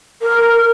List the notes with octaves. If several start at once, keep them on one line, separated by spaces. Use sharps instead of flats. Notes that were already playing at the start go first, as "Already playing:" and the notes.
A#4